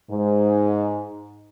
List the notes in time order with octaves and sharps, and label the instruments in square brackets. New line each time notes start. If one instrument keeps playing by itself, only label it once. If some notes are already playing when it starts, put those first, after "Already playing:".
[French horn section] G#2